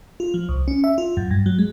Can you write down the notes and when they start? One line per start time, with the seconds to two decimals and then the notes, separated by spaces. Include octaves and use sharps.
0.20 F4
0.34 F3
0.49 C2
0.68 C#4
0.84 E5
0.98 F4
1.17 F#2
1.31 G2
1.46 F#3
1.59 G#3